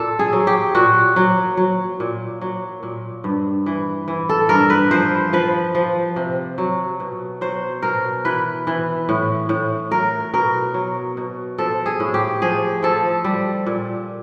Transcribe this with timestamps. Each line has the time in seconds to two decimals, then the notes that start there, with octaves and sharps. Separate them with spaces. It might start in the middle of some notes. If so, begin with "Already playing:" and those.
Already playing: A#2 A4
0.19 G#4
0.33 F#3
0.47 G4
0.75 A#2 F#4
1.16 F#3
1.57 F#3
2.00 A#2
2.41 F#3
2.83 A#2
3.24 G2
3.66 E3
4.08 E3
4.29 A4
4.49 G2 A#4
4.70 B4
4.91 F3 C5
5.33 F3 B4
5.75 F3
6.16 C3
6.58 F#3
7.00 B2
7.41 F#3 C5
7.82 B2 A#4
8.25 E3 B4
8.67 E3
9.09 A2
9.49 A2
9.91 F#3 A#4
10.33 B2 A#4
10.74 F#3
11.17 B2
11.58 F3 A4
11.86 G#4
12.00 A2
12.14 G4
12.42 F3 G#4
12.83 F3 A4
13.24 G3
13.66 A#2